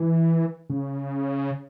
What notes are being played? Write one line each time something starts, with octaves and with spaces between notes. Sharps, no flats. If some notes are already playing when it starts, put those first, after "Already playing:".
Already playing: E3
C#3